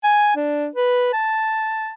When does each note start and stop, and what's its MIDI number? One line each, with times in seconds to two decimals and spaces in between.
0.04 0.32 80
0.36 0.67 62
0.76 1.13 71
1.13 1.93 81